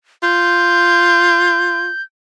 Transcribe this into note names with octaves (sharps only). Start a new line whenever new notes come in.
F4 G6